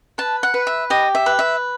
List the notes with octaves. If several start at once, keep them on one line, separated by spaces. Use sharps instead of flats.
B4 A5
F#5
B4
E5
G4 D#5
E5
B4
E5